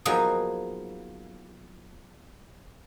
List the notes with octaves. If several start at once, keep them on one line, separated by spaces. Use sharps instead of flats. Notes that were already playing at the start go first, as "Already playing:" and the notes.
F3 F#3 A#3 B3 D#4 G#4